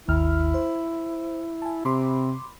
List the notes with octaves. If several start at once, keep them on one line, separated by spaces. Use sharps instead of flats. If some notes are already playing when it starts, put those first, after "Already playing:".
G#1 D#2 E4 F6
C5
G#5 A5
C3 B5 C6 D6